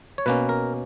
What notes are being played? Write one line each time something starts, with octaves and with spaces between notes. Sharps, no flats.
C#5
B2 A#3 C#4 B4
A#4